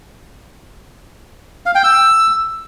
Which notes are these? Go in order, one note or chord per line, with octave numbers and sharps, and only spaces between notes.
F5
G5
E6